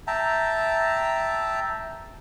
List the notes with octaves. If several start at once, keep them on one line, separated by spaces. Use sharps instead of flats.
E5 G5 A5 A#5